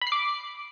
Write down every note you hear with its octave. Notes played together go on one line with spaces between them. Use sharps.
B5
C7
D6